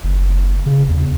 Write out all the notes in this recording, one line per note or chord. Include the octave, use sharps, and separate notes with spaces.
F#1
C#3
E2